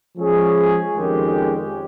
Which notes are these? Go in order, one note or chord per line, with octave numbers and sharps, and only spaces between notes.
F3 G#3 C#4 G#4
F2 D#3 G#3 C#4 G4